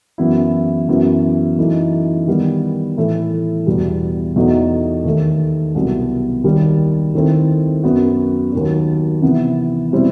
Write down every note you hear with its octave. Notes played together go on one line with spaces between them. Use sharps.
F#2 E3 B3 E4
F#2 E3 B3
F#2 E3 A3 D#4
D#3 G3 B3
A2 E3 A3 E4
E2 B2 G3
E2 B2 A3 D#4 F#4
D#2 D#3 A3
C2 B2 F#3 B3 F#4
D#2 D#3 G3
D#2 D#3 A3 C4 E4
F#2 F#3 B3 F#4
D#2 D#3 F#3
C3 E3 B3
B2 G3 C4 E4